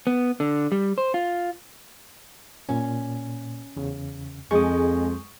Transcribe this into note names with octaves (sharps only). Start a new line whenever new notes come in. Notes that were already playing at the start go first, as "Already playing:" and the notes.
B3
D3
G3
C5
F4
A#2 C#4
E2 C#3
F2 F3 G#3 C#6 D#6